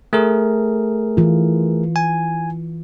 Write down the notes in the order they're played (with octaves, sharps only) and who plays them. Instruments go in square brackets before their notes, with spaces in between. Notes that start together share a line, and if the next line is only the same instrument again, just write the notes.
[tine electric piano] A3 G#4 A#4
[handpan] E3 F4
[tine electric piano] G#5